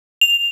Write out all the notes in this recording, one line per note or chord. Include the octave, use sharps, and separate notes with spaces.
F7